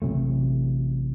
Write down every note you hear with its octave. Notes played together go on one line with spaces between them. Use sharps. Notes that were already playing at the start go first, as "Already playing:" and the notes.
A1 C3 F#3 A3